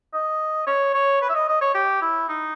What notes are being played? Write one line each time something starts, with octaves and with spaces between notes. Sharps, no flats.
D#5
C#5
C#5
B4
E5
D#5
D#5
C#5
G4
E4
D#4